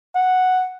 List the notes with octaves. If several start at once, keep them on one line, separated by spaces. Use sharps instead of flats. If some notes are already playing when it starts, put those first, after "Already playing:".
F#5